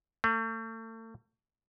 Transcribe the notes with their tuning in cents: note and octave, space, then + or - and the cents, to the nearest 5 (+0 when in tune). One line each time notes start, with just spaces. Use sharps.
A3 +40